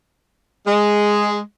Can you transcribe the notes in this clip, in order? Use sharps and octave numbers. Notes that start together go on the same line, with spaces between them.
G#3